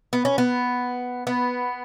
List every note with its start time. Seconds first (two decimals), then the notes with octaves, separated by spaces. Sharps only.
0.13 B3
0.25 C#4
0.38 B3
1.27 B3